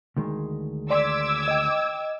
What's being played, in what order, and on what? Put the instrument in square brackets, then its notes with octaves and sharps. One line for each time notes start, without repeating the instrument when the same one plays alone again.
[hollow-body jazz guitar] D2 D#3 G#3
[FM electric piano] D5 C6 B6 [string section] D6 E6 G#6
[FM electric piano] D#5 G5